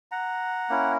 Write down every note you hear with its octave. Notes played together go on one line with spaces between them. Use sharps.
F#5 A#5
A#3 C#4 E4